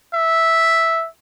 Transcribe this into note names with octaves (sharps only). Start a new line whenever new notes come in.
E5